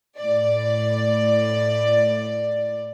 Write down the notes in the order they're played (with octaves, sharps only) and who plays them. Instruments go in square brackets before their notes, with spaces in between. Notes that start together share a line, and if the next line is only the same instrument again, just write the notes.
[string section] A2 D5